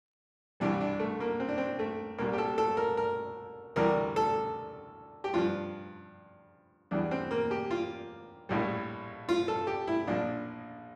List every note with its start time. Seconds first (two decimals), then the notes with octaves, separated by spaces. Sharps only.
0.60 C2 C3 E3 G3 D4
0.80 D4
1.00 A3
1.20 A#3
1.40 C4
1.48 D4
1.58 C4
1.79 A3
2.18 C2 A#2 G3 A#3
2.33 G4
2.38 A4
2.58 A4
2.77 A#4
2.97 A#4
3.76 D2 C3 E3 G3 A#4
4.16 A4
5.24 G4
5.34 G2 F3 F4
6.91 E2 E3 G3 D4
7.11 C4
7.31 A#3
7.51 G4
7.71 F4
8.49 A#1 A2 G3
9.29 F4
9.48 A4
9.67 G4
9.87 E4
10.07 A#1 A#2 F3 D4